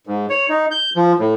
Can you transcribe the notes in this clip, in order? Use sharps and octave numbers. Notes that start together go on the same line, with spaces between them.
G#2
C#5
D#4
G6
F3
A2